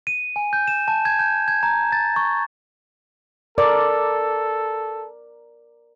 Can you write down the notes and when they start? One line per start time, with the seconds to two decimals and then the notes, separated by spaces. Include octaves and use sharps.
0.07 D#7
0.36 G#5
0.53 G6
0.68 E7
0.88 A5
1.05 G#6
1.19 G6
1.48 G#6
1.63 A#5
1.92 A6
2.16 C#6
3.58 A4 A#4 D5